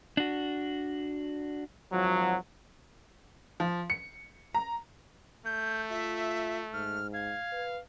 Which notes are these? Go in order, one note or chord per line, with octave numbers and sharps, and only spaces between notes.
D4 F#4
G#1 F3 F#3
F3
C#7
A#5
A3 G6
F4 E5
G#2 F6
F5 G#6
B4